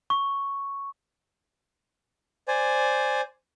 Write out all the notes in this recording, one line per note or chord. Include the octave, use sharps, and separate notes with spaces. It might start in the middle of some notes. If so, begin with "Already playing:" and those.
C#6
C5 D5 G#5